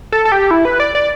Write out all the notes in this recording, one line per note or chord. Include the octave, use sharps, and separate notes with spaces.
A4
A4
G4
E4
B4
D5
D5